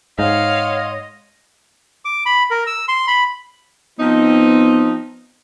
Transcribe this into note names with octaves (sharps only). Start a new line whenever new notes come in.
G#2 C#5 D#5 F5 F#5 C6
D6
B5
A#4
E6
C6
B5
F3 B3 C4 D#4